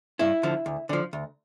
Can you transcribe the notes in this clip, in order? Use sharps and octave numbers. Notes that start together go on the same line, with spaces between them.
G2 E4
D3 F3
D2
D3 F3
D2